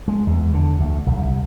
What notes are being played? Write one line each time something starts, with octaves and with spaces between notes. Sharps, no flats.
G#3
E2
D3
D2
B1
C2